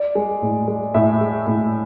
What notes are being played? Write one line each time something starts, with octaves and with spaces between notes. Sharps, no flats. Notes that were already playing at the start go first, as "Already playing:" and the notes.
Already playing: D5
G#3
A2
G#3
A2 E5
G#3
A2